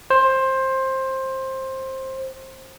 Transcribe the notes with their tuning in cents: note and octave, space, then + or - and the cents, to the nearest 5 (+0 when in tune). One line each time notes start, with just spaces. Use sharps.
C5 +15